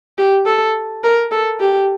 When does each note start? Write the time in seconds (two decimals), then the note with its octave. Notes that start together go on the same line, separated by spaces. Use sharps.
0.18 G4
0.46 A4
1.04 A#4
1.32 A4
1.60 G4